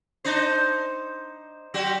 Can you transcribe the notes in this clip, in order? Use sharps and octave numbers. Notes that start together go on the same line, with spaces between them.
D4 D#4 C5
F#3 F#4 G4